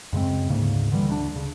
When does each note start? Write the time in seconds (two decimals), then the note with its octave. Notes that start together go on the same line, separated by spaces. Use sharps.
0.13 F#2 C#3 G#3 C4
0.49 D2 G#2 C#3 A#3
0.92 D3 E3 G3
1.10 D2 D3 D4
1.36 C#3